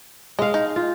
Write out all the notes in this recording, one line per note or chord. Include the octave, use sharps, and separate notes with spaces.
G#3 D#5 F5
D#4
F4